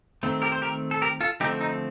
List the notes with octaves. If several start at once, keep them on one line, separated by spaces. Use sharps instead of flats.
D#3 A3 C4
G4 A#4
C5
G4 A#4
A4
G4 A#4
F4 A4
D3 F3 A3 C4 D#4 G4
D#4